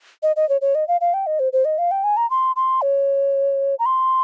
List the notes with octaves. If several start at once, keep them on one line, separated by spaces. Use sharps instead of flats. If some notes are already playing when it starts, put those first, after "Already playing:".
D#5
D#5
C#5
C#5
D#5
F5
F5
G5
D#5
C5
C5
D#5
F5
G5
G#5
A#5
C6
C6
C#5
A#5
C6